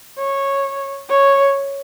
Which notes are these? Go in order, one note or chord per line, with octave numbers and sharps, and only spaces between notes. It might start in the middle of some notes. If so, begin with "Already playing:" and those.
C#5
C#5